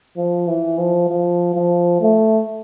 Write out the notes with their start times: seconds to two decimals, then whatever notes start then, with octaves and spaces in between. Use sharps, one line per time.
0.17 F3
0.47 E3
0.78 F3
1.09 F3
1.55 F3
2.01 A3